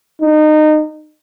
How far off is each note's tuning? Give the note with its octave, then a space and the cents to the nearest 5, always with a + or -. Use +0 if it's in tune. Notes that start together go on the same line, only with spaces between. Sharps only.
D#4 -25